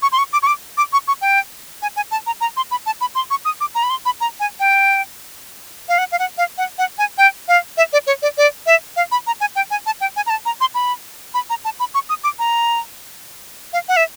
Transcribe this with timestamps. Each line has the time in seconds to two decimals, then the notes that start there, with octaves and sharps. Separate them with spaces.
0.02 C#6
0.12 C6
0.18 C#6
0.33 D6
0.43 C#6
0.47 D6
0.77 D6
0.93 C#6
1.08 C#6
1.21 G5
1.82 G#5
1.96 G#5
2.11 A5
2.26 A#5
2.41 A#5
2.57 C6
2.71 B5
2.86 A5
3.01 B5
3.15 C6
3.30 C#6
3.45 D#6
3.61 D6
3.75 A#5
3.83 B5
3.90 C6
4.06 B5
4.21 A#5
4.40 G#5
4.60 G5
5.89 F5
5.98 F#5
6.12 F5
6.19 F#5
6.38 F5
6.58 F#5
6.78 F#5
6.98 G#5
7.18 G5
7.48 F5
7.77 E5
7.93 D5
8.07 C#5
8.22 D5
8.38 D5
8.66 E5
8.96 F5
9.12 B5
9.27 A#5
9.41 G#5
9.55 G5
9.71 G#5
9.86 A5
10.01 G5
10.16 G#5
10.26 A#5
10.30 A5
10.45 A#5
10.61 C6
10.75 B5
11.34 B5
11.50 A#5
11.65 A5
11.80 B5
11.94 C#6
12.09 D#6
12.24 D6
12.39 A#5
13.73 F5
13.89 F#5
13.97 E5